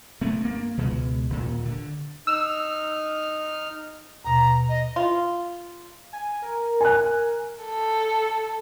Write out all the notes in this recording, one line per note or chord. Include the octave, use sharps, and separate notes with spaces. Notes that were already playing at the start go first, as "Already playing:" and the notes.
A3 B3 C4
G2 A#3
C#2 B2 G#3
D#1 A#2
D3
D#4 E6 F6
D#2 B2 A#5
D#5
F4
G#5
A#4
G#5 F#6
A4